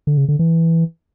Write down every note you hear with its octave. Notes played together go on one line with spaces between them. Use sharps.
D3
C#3
D3
E3